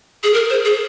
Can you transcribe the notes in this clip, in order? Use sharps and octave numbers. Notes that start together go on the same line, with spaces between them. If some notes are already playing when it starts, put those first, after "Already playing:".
G#4
A#4
C5
G#4